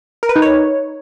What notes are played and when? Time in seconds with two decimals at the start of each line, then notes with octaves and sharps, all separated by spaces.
0.23 A#4
0.29 B4
0.36 D#4
0.42 C#5